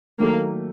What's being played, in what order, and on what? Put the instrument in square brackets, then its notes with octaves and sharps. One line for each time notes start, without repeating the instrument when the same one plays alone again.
[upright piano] D#3 F#3 A3 [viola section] A#3